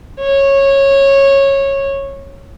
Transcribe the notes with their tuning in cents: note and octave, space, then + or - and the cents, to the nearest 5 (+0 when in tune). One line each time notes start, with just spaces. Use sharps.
C#5 -15